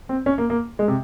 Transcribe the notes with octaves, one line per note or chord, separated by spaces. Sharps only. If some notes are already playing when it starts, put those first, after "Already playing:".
C4
C#4
A#3
A#3
G#3
C3